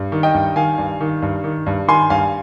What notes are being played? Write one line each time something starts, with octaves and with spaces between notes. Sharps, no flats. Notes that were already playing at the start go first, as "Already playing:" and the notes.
Already playing: G2
D#3
D#5 G5
G2
D#3 F5 G#5
G2
D#3
G2
D#3
G2
D#3 G#5 C6
G2 F5 G#5